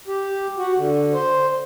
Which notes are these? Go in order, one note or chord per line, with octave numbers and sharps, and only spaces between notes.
G4
F#4
D3
C5